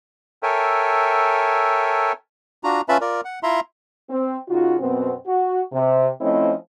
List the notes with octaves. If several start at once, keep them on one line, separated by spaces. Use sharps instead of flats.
A4 A#4 C#5 E5 G5 G#5
D4 F4 F#4 A#5
C#4 F4 B4 E5 A5 B5
F4 A#4 D5
F#5
E4 F4 E5 A#5 C6
C4
C#3 D#4 F4 F#4
F#2 B2 B3 C4
F#4
C3
F3 A3 C4 C#4 E4 D#5